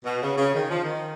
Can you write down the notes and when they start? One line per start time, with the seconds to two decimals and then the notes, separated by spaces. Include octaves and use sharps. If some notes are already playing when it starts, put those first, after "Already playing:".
0.05 B2
0.21 C#3
0.38 C#3
0.54 D#3
0.69 F3
0.83 D#3